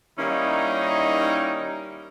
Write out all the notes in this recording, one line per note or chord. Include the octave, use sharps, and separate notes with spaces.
D#3 G3 A#3 C#4 D#4 E4